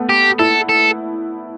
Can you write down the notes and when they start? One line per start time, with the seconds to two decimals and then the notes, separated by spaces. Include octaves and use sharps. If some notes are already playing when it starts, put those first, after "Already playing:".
Already playing: A3 B3
0.09 G4
0.39 E4 A4
0.69 A4